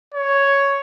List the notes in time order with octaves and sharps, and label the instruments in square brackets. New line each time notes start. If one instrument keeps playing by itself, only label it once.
[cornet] C#5